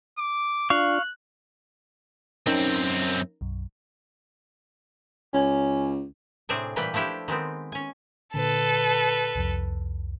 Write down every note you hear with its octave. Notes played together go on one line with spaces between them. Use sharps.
D6
D4 F4 F5 C#6 F#6
F#2 C4 C#4 D#4 A#4
B1 F#2
C#2 C#4
A2 C3 C4 D4 G#4 G#5
A#2 E3 G3 A3 B4 G5
F3 A3 D4 E4 G4
D#3 G#3 B3 C4
C#4 G#5
A#2 D3 A4 B4
C2 F2